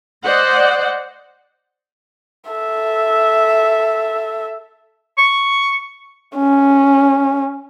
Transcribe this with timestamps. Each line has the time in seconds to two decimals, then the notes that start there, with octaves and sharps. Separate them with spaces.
0.24 C5 D5 D#5 F#5
2.50 A4 E5
5.18 C#6
6.36 C#4